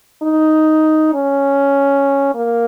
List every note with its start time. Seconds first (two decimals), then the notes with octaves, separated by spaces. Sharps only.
0.23 D#4
1.14 C#4
2.35 A#3